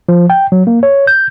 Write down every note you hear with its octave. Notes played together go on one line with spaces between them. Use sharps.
F3
G5
F#3
A#3
C#5
G6